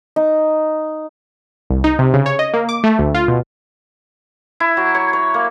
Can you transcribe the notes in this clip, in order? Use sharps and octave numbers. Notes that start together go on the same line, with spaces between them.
D#4
C2
D#4
C3
C#3
C#5
D#5
A#3
D6
A3
D2
F4
B2
E4
F#3
C#5
C#5
A#3